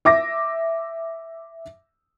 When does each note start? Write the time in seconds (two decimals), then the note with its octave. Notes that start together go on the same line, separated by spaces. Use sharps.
0.05 E5 D6 A#6